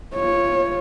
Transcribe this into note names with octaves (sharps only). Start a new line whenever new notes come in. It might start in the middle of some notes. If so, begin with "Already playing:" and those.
F4 C#5